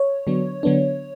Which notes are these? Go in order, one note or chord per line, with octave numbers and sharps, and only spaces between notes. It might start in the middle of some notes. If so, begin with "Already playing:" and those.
Already playing: C#5
D3 F#3 B3 D4
D3 F#3 B3 D4